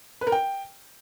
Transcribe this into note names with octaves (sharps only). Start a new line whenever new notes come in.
B4
A#4
G5